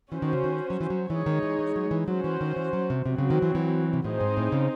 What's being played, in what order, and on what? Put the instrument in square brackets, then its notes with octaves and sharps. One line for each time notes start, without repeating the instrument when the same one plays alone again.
[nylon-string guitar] E3 [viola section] C#4 F#4 C5
[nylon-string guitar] D#3
C#3
D#3
F#3
E3
F#3
[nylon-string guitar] E3 [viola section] G#3 D#4 G#4 C#5
[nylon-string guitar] D#3
E3
E3
F#3
E3
[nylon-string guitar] F#3 [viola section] C#4 F#4 C5
[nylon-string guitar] E3
D#3
E3
F#3
C3
[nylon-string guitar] C3 [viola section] F#3 C4 F#4
[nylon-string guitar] C#3
D#3
E3
E3
C3
[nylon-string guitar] A2 [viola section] C4 D#4 G#4 C5
[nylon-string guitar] G#2
A2
C#3